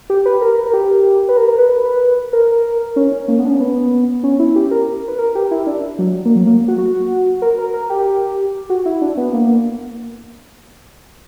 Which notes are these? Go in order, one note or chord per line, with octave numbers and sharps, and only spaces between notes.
G4
B4
A#4
A#4
G4
B4
A#4
A#4
B4
B4
A#4
C#4
C#4
A#3
B3
D4
C#4
B3
C#4
E4
G4
A#4
B4
A#4
G4
E4
D4
F#3
A#3
F#3
A#3
F#4
F#4
A#4
A#4
A#4
G4
F#4
E4
D4
B3
A#3